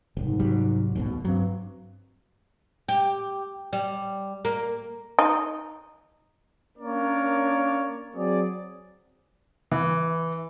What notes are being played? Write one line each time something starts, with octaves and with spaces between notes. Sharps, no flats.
F#1 C2 G#2
C2 F#3 G3
D1 A1 B2
G2 F#3 C4
G4
G3
A#3
D#4
A#3 C#4 D4 A#4 C#5 D5
F#3 C4 G#4 D5
E3